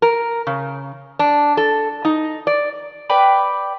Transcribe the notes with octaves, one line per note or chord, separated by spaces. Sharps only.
A#4
C#3
D4
A4
D#4
D5
B4 D5 G5 B5